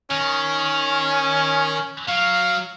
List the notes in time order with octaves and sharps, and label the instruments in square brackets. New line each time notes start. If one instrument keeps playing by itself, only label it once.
[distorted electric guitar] D#3 [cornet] C#4
[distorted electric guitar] F#3 [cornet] F5